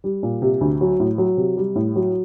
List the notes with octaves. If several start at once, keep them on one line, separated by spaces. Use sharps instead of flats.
G3
A#2
C3
D2
F#3
A2
F#3
C3
G3
A2
F#3